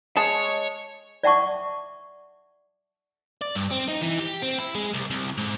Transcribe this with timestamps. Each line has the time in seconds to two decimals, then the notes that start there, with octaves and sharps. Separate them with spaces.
0.17 G#3 C#5 A5
1.24 D5 E5 F#5 A5 C#6 D6
3.41 D5
3.55 G2
3.71 C4
3.89 D#4
4.02 E3
4.19 G4
4.42 C4
4.59 E4
4.75 G#3
4.94 C2
5.10 C2
5.38 G#2